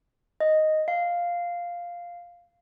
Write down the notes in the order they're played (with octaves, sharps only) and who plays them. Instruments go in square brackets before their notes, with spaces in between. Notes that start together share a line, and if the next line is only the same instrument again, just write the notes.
[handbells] D#5
F5